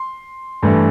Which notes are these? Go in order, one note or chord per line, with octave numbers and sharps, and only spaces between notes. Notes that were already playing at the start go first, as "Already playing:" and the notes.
Already playing: C6
G2 E3 A3